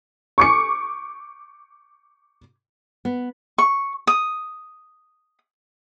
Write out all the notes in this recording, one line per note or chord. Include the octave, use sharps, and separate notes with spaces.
C#6 D6 C#7
B3
C#6
D#6